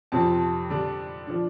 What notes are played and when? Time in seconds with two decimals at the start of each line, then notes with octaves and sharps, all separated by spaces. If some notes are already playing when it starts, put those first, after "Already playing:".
0.12 F2 C3 F3 C4 A5
0.70 D3 G3 D4
1.27 F3 D4